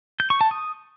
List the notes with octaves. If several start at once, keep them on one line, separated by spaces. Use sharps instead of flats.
G6
C#6
A5
D#6